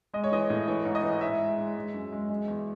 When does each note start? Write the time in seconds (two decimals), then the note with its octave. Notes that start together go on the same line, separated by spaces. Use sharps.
0.13 G#3 D#5
0.24 C#5
0.32 E3 D#5
0.50 A2
0.68 E3 C#5
0.85 G#2
0.95 D#5
1.03 E3
1.21 G#2 E5
1.40 G#3
1.58 G#3
1.76 G#3
1.94 F#2
2.12 G#3
2.29 G#3
2.48 E2